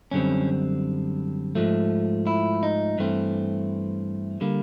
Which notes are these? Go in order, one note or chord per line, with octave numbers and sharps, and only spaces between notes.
F#2 D3 G3 C4 C#4
G#2 F3 A3
E4
D#4
G2 E3 A3 C4
D3 G3 A#3